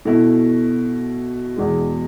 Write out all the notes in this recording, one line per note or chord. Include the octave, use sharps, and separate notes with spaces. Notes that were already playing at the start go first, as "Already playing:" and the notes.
B2 A3 E4
E2 B2 G#3